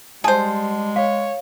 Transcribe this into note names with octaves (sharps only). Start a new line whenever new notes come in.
G3 G#3 G#4 C5 A5
C#5 F5